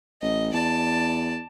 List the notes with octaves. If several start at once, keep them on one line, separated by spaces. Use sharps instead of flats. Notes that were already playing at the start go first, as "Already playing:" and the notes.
A1 D#5
E2 D5 A5